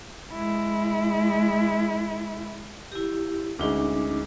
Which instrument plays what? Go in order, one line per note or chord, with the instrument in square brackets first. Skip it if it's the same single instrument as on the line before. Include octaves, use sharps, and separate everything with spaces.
[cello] G#3 E4
[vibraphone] E4 G4
[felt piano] D2 G#3 [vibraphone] C#4 D#4 D6